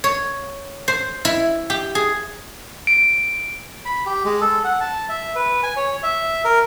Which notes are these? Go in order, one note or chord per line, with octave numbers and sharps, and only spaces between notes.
C#5
C5
E4
G4
G#4
D7
B5
G4
G#3
A4
F#5
A5
E5
B4
G#5
C#5
E5
A#4